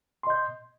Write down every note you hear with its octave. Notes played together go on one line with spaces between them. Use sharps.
D#5 C6 G6